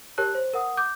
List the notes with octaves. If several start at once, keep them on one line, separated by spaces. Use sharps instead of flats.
G4 A#4 C#5 A5 F#6
C5
A#4 F#5 D#6
D6 G6